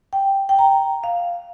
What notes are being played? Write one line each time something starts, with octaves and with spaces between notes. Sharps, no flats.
G5
G5
A#5
F5